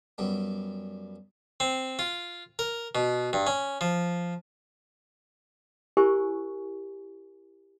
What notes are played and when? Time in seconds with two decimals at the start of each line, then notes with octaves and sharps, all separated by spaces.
0.18 F#2 G3 B3
1.60 C4
1.99 F4
2.59 A#4
2.95 B2
3.33 G2
3.47 C#4
3.81 F3
5.97 E4 G4 A#4 C5 G#5 C#6